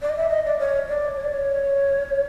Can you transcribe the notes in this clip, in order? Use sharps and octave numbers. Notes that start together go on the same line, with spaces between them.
D5
D#5
E5
D#5
D5
C#5
D5
C#5
D5
C#5